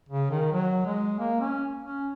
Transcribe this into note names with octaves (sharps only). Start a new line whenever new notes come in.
C#3
D#3
F#3
G#3
A#3
C#4
C#4